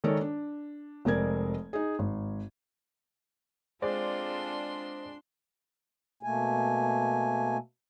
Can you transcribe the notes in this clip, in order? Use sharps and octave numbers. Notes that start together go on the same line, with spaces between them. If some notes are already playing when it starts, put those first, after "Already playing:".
D#3 G#3 A4 A#4 C#5 D5
D4
F1 G#3 C4 A#4 D5 G#6
D#4 G#4
G#1
G#3 C4 D4 F4 A4 C5 D5 C6
B2 A3 A#3 G#5